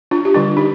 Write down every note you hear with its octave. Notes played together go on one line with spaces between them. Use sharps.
D4 F4
G4
D3 G3 D4 F4
D#4 G4